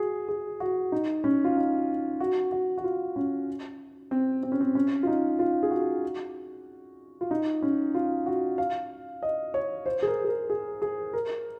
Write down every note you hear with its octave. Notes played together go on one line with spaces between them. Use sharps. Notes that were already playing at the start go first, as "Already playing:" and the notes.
Already playing: F#4 G#4
G#4
F#4
D#4
C#4
F4
D#4
F#4
F#4
F#4
F4
C#4
C4
C4
C#4
C4
C#4
F4
D#4
F4
G#4
F#4
F4
D#4
C#4
F4
F#4
F5
D#5
C#5
C5
G#4
A#4
G#4
A#4
G#4
G#4
A#4